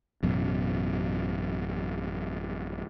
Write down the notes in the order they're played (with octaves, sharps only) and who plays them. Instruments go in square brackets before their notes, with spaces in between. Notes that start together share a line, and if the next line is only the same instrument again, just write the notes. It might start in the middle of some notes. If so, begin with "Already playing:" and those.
[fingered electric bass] A1 F#2 B2